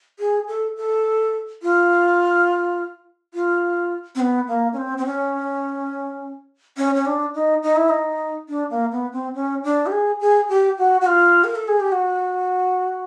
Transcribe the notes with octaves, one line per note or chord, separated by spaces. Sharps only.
G#4
A4
A4
F4
F4
C4
B3
A#3
C#4
C4
C4
C#4
C#4
C#4
D4
D#4
D#4
E4
D#4
D4
A#3
B3
C4
C#4
D4
G4
G#4
G#4
G4
F#4
F#4
F4
A#4
A4
G#4
G4
F#4